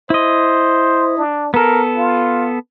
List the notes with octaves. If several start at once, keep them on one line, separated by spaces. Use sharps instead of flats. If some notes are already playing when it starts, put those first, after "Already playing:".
E4 C5 D#5
D4
B3 A4 A#4
F4